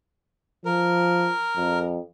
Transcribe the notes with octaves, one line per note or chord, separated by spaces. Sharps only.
F3 A#4
F2